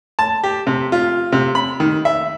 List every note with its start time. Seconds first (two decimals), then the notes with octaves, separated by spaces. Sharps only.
0.19 A5
0.44 G4
0.67 C3
0.92 F4
1.32 C3
1.55 B5
1.80 D#3
2.05 E5